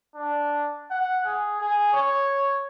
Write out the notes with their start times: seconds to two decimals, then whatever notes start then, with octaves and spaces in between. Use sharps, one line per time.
0.15 D4
0.91 F#5
1.25 G#4
1.61 G#4
1.93 C#5